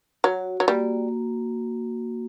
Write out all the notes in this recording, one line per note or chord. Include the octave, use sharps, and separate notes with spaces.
F#3 F#4
F#3
G3 A#3